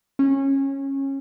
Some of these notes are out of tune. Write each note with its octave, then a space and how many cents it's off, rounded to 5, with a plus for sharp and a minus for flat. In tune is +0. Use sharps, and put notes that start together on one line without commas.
C#4 -20